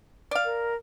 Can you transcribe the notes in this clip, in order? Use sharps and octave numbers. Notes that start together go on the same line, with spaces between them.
D5 F5
A#4